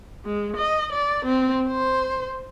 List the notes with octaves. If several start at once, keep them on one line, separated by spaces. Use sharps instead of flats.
G#3
D#5
D5
C4
C5